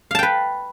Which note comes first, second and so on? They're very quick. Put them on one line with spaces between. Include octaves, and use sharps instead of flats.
F5 A5 G5 B4